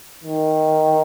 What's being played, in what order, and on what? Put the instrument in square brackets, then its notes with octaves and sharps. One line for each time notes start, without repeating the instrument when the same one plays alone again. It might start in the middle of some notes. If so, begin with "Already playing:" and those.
[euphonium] D#3